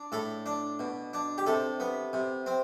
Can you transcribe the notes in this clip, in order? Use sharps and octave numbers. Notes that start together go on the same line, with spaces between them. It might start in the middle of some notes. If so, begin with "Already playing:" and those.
Already playing: D4
A2 A4
D4
B2
D4
G4
C3 A4
B3
C3
C4